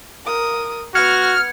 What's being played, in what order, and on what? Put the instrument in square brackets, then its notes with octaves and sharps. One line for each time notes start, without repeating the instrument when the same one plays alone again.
[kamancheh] A#4 D#6
[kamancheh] B3 [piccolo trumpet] F#4 [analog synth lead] F6 [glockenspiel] G#6 C#7